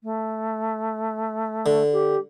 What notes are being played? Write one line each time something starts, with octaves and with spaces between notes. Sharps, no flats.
A3
D3
G4